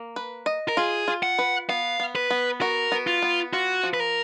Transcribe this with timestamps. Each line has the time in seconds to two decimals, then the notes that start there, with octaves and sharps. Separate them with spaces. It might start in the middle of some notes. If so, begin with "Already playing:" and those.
Already playing: A#3
0.16 B4
0.46 D#5
0.68 A#4
0.77 F4 G#4
1.08 F4
1.23 F#5
1.39 B4
1.69 B3 F5
2.00 B3
2.15 B4
2.30 B3
2.61 F#4 A#4
2.92 B3
3.07 F4
3.22 B3
3.53 F4 F#4
3.83 F3
3.94 B4
4.00 A#4